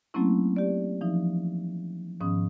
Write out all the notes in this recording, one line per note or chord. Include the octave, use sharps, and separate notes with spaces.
F#3 A3 A#3 C4 C#4 E4
G4 D5
E3 F3 D#4
G#2 D#3 F3 B3 C#4 D#6